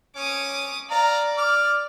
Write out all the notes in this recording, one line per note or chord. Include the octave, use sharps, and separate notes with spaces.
C#4 D6 D#6
D5 F5 A#5
D6 F6